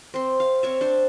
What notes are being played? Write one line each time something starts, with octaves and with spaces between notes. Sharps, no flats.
C4 C6
F5
C4 C#5 E5
D4 C5 C6